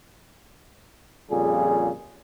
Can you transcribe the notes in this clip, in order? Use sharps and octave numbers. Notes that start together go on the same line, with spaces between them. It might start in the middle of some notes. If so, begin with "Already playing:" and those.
F2 A#2 C#3 G3 G#4